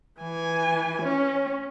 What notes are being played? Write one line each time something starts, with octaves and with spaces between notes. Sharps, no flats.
E3 G#5
C#4